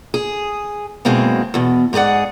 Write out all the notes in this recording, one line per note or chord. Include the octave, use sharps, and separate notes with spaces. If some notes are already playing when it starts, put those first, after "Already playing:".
G#4
F#2 B2 G#3 A#3 C4 E4
E2 B2
G#2 G4 G#4 D5 F#5